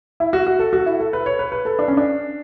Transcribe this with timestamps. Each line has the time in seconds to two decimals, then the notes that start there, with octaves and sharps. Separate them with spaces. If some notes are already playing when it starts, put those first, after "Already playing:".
0.20 E4
0.33 F#4
0.47 F#4
0.59 A4
0.73 F#4
0.86 E4
1.00 A4
1.13 B4
1.26 C#5
1.39 B4
1.52 B4
1.65 A4
1.79 D4
1.88 C#4
1.97 D4